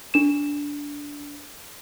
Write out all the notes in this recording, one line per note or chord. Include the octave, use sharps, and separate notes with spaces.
D4 E7